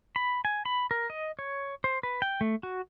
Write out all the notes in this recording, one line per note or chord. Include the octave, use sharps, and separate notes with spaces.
B5
G#5
B5
A#4
D#5
C#5
C5
B4
G5
A3
F#4